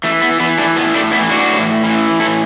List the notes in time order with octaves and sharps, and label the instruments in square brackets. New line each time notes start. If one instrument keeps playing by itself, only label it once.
[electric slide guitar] E3 A3
B3
E3 B3 E4
A3 D4
A2 B3
A3 D4
E3 B3 E4
D4 F#4
A2
E3
A2 E4 A4